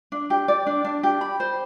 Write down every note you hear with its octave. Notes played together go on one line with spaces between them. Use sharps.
D4
G4
D5
D4
D4
G4
B5
C5